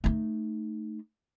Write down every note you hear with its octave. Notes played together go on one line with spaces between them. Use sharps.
A3 D#4